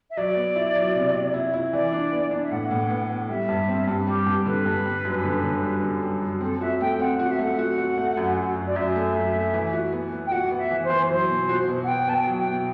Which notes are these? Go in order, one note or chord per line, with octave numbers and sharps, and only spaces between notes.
E5
F#3 D5
B3
E4
F#3
C3
C3
E4
E4
E3 D5
D4
B3
D4
E5
A2 F#5
A2
B3
B3
G3 E5
G2
C4
G2
G3 G4
G2
D3 B4
G2
G3
F#2
D3
D3
G3
D3
G3
F#2
C4 A4
F#4 E5
A3 G5
C4 F#5
F#4 F#5
E5
A3 F#5
F#4
F#4
A3
F#2
F#2
F#2
D5
F#2 E5
A3
F#2
A3
E3
F#4
B3
B3
G5
F#4 F#5
B3
E5
E3
C5
E3
F#3 C5
B2
F#4
B2
F#5
B3 G5
B3 A5
G5
F#3
G5
B2